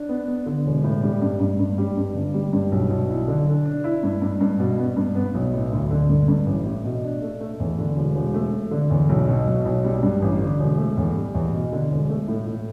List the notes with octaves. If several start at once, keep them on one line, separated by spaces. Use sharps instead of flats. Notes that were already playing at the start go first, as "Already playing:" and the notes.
Already playing: D4
B3
B3
D3
E1
A2
G3
G2
G2
G2
G3
G2
G1
G3
G2
B1
B1
E4
D3
D4
D4
E4
G2
G2
G2
B2
B3
G2
B3
B1
A2
D2
D3
G2
G2
A1
A2
B2
D4
A3
A3
E2
D3
E1
E1
A3
A3
D3
E2
B1
B2
B1
B1
G3
G2
A1
D3
E1
A3
E2
G3
E2
B2
D3
E1
A3
A2
A2